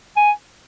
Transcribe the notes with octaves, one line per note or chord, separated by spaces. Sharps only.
G#5